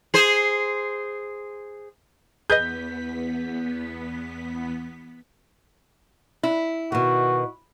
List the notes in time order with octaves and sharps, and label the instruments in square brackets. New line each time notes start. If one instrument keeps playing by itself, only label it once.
[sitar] G#4 C5
[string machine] E2 B3 B6 [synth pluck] G#4 B4 D#5 [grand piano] G6
[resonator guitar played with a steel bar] E4
[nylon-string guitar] B2 D#3 [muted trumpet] F#4